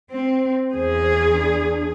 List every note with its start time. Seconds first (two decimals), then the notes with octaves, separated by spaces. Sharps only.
0.11 C4 C5
0.75 E2 G#4
1.33 D4